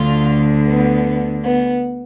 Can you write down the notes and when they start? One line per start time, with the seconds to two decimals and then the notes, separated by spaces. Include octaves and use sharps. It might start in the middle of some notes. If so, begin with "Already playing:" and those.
Already playing: D2 D3 F4
0.68 B3
1.44 B3